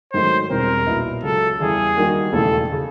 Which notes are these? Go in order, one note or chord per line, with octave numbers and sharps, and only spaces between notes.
G#2 D#3 F#3 A3 C5
E1 E2 B2 G3 C4 A#4
B1 A#2 F#3 B3 E4
C#2 C#3 F#3 A4
E2 C#3 E3 G3 G#4
D#3 G3 A#3 D#4 F#4
E1 D#2 C#3 E3 A3 A4
C#3